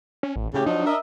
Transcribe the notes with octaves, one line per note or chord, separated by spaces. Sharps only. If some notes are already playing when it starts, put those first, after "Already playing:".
C#4
A1
A2 C#3 G4
F3 F#3 D4 D#4
A#4 D#5 E5